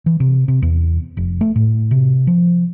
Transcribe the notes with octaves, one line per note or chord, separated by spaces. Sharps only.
E3
C3
C3
E2
F1
A3
A2
C3
F3